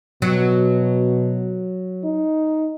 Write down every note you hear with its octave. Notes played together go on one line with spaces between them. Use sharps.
B2 F#3
D#4